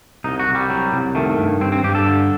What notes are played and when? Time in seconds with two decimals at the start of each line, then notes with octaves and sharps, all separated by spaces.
0.24 C2 D#4
0.40 F#4
0.47 C2
0.55 G3
0.70 F#3
0.93 C2
1.15 D#3 A3
1.38 G2
1.61 G2 C4
1.72 C4
1.84 G2 G4
1.95 A4
2.06 D3